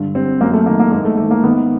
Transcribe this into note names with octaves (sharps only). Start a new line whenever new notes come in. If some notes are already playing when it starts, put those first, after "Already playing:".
Already playing: G2 D3
G3 C4
F#2 A#3
A3
D#3 A#3
A#3
G#2 A#3
A3
D#3 A3
A#3
D#3 B3